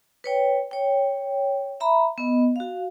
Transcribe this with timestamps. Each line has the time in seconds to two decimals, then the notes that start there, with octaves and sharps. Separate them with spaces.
0.24 B4 C#5 G5
0.71 C#5 G5
1.80 E5 A#5 B5
2.18 B3 D#5
2.56 F#4 F5